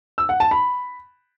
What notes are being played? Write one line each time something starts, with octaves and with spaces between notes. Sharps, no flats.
E6
F#5
A5
B5